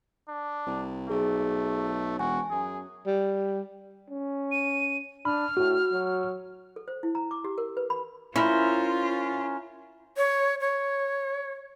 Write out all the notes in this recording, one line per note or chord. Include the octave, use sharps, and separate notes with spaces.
D4
C2
B1 A3 G#4
E1 F#4 G#5
F#2 G#4
G3
C#4
D#7
D4 B5 F6
A2 F#4
F#3
A4
C5
E4
A#5
D6
G4
A#4
B4
B5
C#4 E4 F4 A#4 C5
C#5
C#5